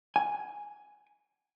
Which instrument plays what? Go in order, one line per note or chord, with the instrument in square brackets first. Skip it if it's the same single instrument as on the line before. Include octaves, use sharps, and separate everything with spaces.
[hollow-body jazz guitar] G#5